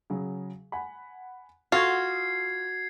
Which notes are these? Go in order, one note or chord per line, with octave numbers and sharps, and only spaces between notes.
C#3 F#3 G#4
F#5 G#5 B5
F4 F#4 A4 D#6 F6 G#6 C7